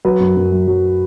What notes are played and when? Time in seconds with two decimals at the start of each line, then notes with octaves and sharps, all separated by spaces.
0.05 F#3 B4
0.20 F#2
0.37 F#2
0.52 F#3
0.67 F#3